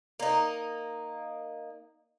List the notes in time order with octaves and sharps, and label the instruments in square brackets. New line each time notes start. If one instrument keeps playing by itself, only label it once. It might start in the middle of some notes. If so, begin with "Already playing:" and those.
[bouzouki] A#3 D#4